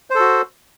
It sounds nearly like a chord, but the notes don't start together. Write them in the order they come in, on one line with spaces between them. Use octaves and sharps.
C5 A4 F#4